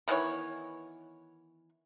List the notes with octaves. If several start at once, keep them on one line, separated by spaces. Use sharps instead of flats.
D#3 E3 B3 C#5